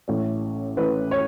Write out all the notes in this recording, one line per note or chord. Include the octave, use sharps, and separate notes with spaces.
A1 A2 A3 C#4
A1 A2 A3 C#4 B4
C#5